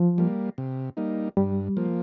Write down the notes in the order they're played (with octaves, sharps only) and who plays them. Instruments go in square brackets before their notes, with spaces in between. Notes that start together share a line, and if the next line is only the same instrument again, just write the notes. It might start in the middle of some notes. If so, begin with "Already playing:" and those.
Already playing: [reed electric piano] F3
[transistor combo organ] G3 A#3
C3
G3 A#3 D#4
[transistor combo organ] G2 [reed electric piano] G3
[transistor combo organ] F3 A#3